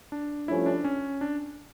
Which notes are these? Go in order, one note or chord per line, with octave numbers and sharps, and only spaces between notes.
D4
G2 F3 A3 C#4 E4
D4
C#4
D4